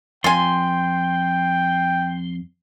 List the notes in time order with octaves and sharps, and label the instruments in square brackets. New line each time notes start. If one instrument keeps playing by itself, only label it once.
[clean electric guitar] F2 [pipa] F4 G#5 [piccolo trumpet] G5 [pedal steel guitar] C6